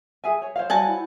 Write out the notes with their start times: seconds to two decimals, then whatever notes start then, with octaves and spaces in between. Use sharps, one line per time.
0.24 G#4 E5 G#5
0.42 C#5
0.56 C5 C#5 F5
0.70 G3 F#4 G#5 A5
0.88 E4